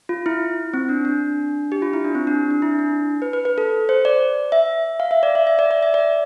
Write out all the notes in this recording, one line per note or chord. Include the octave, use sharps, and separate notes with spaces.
F4
E4
C4
D4
D4
G4
F4
E4
D4
C4
D4
D4
E4
D4
B4
B4
B4
A4
C5
D5
E5
F5
E5
D5
E5
E5
D5
D5
E5
D5